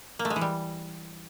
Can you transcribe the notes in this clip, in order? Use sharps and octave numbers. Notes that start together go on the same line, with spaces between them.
A#3
A3
G#3
E3
G3